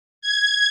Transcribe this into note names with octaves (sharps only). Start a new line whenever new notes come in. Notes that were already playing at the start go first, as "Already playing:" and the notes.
G#6